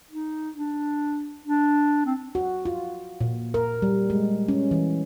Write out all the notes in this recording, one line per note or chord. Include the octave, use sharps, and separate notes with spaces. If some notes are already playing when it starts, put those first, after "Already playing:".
D#4
D4
D4
C4
F#4
F4
A#2
A#4
G3
G#3
C#4
E3